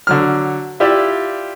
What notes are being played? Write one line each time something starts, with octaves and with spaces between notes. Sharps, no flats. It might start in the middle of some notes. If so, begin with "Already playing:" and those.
D3 F#3 F6
E4 F4 G4 D5 E5